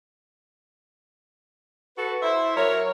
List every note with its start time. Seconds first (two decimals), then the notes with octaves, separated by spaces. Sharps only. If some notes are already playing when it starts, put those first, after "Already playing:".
1.97 F#4 A4 B4
2.22 E4 C5 E5
2.56 F#3 A#4 C#5